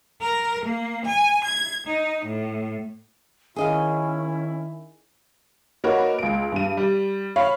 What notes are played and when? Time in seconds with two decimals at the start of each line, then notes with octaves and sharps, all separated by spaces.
0.21 A#4
0.66 A#3
1.06 G#5
1.45 G#6
1.87 D#4
2.25 A2
3.56 D#3 C#4 E4 G#4 D#5 F5
5.84 A#3 D#4 F#4 A#4 B4 C#5
6.19 C#2 D7
6.52 G2 D#7
6.77 G3
7.36 C#5 F5 B5